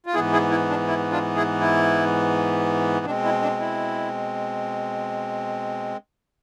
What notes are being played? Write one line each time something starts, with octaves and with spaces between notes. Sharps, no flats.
F4
G#2 E3 B3 E4 G#4
E4 G#4
E4
D4
E4
D4 F4
E4 G#4
E4
B2 G#3 C4 D4
E4
D4
E4